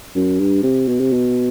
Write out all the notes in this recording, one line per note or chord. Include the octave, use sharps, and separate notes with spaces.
F#2
G2
C3
B2
C3
B2